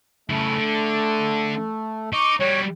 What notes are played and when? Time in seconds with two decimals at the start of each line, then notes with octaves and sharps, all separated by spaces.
0.30 C#3 A3 E4
0.57 D3
2.13 D#4 C#6 D6
2.41 G3 F#4 C#5